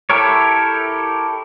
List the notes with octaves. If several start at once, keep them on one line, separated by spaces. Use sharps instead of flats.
E4 G4 A4 A#4 C#5